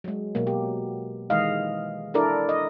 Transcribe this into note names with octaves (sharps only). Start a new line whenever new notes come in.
F#3 G#3
B2 F#3 A#3
G4
D#3 E3 G#3 D#5 F5
D4 E4 A4 A#4 D5
D#5